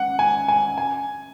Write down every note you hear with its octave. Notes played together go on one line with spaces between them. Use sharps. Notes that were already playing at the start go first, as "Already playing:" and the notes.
Already playing: F#5
G#5
G#5
G#5